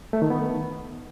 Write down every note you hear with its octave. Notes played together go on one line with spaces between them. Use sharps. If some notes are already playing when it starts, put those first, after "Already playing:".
A3
D#3
B3